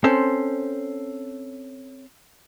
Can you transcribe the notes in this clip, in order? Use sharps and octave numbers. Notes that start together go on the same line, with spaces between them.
C4 C#4 A4 C5